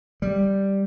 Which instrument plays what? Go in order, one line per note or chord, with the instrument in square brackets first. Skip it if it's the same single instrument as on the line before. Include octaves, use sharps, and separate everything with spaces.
[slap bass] G3